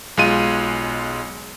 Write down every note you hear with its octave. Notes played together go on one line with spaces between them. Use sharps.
B1 G#3 F4 D#7